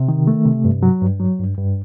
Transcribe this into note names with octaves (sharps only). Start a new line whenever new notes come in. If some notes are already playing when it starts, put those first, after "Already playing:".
Already playing: C3
D#3
A3
C3
G2
F#3
G2
F#3
G2
G2